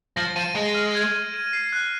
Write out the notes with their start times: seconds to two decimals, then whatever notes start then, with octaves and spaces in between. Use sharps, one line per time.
0.16 F3 A#6
0.36 F3 D#7
0.55 G#3 D#7
0.75 F6
0.95 G#6
1.14 D#7
1.34 D#7
1.53 C7
1.73 F#6